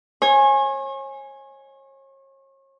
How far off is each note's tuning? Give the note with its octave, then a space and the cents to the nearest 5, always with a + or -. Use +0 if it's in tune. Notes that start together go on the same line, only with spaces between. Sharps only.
C#5 -40 G#5 +0